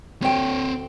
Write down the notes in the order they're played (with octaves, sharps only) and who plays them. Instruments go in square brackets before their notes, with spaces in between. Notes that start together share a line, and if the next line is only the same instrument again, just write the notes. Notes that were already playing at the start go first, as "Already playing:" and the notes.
[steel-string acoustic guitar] D2 G5 [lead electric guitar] C4 C#5